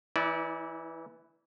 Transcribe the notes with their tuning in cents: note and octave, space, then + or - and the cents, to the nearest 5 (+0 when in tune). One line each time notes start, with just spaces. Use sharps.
E3 +0 E4 -45 D5 -15